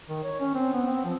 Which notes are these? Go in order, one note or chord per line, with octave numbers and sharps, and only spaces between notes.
D#3
C#5
C#4
C4
B3
C4
F3